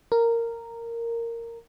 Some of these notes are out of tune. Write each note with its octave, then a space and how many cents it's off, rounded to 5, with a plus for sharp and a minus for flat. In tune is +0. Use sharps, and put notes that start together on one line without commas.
A#4 -10